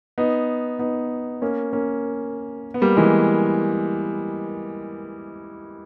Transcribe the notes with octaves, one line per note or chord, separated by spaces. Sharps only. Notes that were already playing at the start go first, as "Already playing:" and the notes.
B3 D#4
B3 D#4
A#3 C#4
A#3 C#4
B3
G3 A#3
E3 G#3